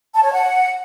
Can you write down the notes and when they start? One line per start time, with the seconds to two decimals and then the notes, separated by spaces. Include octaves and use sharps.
0.14 A5
0.23 C#5
0.32 F#5